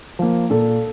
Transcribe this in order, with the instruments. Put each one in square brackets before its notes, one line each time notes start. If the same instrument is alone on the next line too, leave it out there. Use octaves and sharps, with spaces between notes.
[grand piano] F3 A#3
A#2 A4